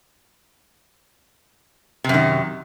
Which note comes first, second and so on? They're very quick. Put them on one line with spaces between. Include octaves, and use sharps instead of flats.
C3 F#2 D#3